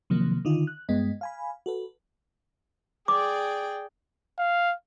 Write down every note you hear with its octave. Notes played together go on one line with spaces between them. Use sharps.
C3 D#3 F3 F#3 A#3
D3 D#3 D#4 F4
F#6
G2 G#3 B3 D#5
F5 G#5 B5
F#4 A4 B4
G#4 D5 G5 D6
F5